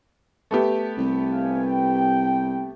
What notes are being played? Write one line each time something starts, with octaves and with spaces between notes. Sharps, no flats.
A3 B3 G4
C2
D#2 F5 G#5
G5